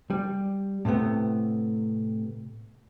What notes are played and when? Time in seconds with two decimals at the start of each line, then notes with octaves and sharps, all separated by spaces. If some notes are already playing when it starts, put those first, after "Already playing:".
0.10 G3
0.85 A2 C3 A3 B3